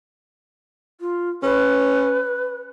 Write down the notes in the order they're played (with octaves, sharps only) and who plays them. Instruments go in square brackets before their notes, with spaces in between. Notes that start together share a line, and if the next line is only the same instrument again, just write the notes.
[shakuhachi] F4
[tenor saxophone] C#4 [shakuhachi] B4